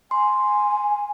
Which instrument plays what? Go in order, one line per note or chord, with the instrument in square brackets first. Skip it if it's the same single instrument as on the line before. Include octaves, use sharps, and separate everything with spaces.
[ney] G#5 [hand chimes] C6